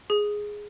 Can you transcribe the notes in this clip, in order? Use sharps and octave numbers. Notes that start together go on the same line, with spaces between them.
G#4